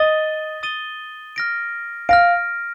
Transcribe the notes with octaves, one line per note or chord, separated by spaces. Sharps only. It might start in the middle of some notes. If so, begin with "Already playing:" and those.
Already playing: D#5 D#6 A6 D#7 G7
D#6 A6 D#7 G7
F6 A#6 D7
F5 F6 A#6 D7